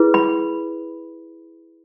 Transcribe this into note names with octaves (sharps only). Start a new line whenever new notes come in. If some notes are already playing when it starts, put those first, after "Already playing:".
Already playing: E4 G#4 B4
B5